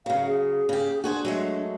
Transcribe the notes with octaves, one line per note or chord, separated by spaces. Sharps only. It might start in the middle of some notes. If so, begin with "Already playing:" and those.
C#3 F#3 F5
G#4
C#3 G4
D4 F#4 G#4 C5
F#3 G#3 A3